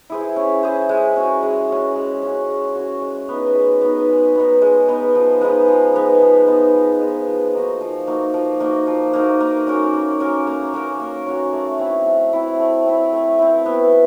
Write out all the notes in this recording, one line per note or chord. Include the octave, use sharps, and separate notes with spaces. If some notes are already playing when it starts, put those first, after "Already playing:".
E4 G#4 C5
C#4
E4 G#4 C5
G#3
C#4 F#4
G#3
C#4 F#4
G#3
C#4 F#4
G#3
C#4 F#4
G#3
B3 D#4
G#3
B3 D#4
G#3
B3 D#4
G#3
B3 D#4
F3
G#3 B3 D#4
F3
G#3 B3 D#4
F3
G#3 B3 D#4
F3
G#3 B3 D#4
F3
A#3 D#4 F#4
F3
A#3 D#4 F#4
F3
A#3 D#4 F#4
F3
A#3 D#4 F#4
A#3
C#4 F#4 A#4
A#3
C#4 F#4 A#4
A#3
C#4 F#4 A#4
A#3
C#4 F#4 A#4
A3
C4 E4
A3
C4 E4
A3
C4 E4
A3
C4 E4
B3